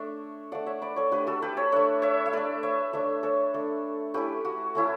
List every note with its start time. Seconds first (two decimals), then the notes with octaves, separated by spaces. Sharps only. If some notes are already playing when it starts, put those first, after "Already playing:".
Already playing: A3 D4 C#5 E5
0.52 A3 D4 D5 F#5
0.66 C#5 E5
0.82 B4 D5
0.96 A4 C#5
1.11 A3 D4 G4 B4
1.27 F#4 A4
1.42 G4 B4
1.57 A4 C#5
1.72 A3 D4 C#5 E5
2.02 C#5 E5
2.26 E5
2.33 A3 D4 B4 D5
2.63 C#5 E5
2.93 A3 D4 C#5 E5
3.23 A4 C#5
3.54 A3 D4
4.14 A3 C#4 E4 G4 B4
4.45 F#4
4.75 A3 C#4 E4